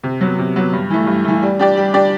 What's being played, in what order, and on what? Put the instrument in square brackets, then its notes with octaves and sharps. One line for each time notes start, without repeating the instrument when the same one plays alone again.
[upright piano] C3
F#3 B3
C3
F#3 B3
G2
E3 A3
G2
E3 A3
G3
D4 G4 D5
G3
D4 G4 D5